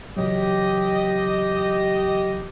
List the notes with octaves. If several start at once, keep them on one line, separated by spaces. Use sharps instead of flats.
C#3 E3 F#3 G4 D#5